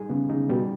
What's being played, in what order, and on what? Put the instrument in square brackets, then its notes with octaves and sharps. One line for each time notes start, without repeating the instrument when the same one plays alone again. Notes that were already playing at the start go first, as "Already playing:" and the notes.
Already playing: [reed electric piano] G3 D#4 G#4
[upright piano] C#3 [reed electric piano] B3
[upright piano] C#3 [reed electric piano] D#4
[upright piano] B2 [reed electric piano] G3